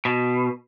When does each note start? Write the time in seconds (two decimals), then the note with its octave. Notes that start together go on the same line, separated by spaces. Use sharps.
0.05 B2